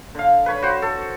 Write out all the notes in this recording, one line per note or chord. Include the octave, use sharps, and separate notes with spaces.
D3 F5
B4 C#5 B5
F#4 C5
A4